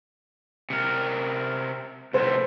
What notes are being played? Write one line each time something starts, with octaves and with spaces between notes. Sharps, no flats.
C3 A#4
C2 A2 C5